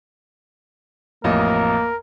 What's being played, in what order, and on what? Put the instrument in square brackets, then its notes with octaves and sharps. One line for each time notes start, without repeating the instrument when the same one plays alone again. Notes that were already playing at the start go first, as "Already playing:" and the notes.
[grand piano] A1 F2 D#5 [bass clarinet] A#3 [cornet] A#4